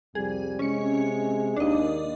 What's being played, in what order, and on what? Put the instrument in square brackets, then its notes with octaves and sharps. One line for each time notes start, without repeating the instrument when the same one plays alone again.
[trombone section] C2 F2 G3 [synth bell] G#4
[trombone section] C3 G#3 [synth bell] C#4 C#7
[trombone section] D#2 [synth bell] D4 D#5